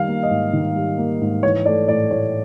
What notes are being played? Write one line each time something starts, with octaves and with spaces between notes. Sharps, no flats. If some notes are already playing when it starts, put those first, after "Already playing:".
Already playing: D#3 G3 F5
A#3
D#5
G#2
D#3
G3
A#3
G#2
E3 C#5
A3 D5
A2 D5
A2 C#5